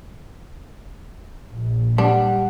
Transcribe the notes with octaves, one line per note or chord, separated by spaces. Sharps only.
A#1
G3 D4 F#5